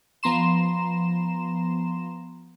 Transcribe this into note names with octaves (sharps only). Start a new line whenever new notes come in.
F3 B3 A#5 C6 E7